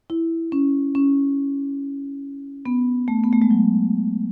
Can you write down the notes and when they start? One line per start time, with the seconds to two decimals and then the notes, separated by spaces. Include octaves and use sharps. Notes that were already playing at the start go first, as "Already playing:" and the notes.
0.10 E4
0.52 C#4
0.95 C#4
2.66 B3
3.08 A3
3.24 B3
3.33 A3
3.42 G#3
3.51 F#3